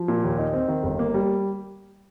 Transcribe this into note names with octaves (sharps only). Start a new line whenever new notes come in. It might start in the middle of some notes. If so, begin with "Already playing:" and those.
Already playing: F3
A#2
D#2
D#4
C4
D#3
G1
A#3
G3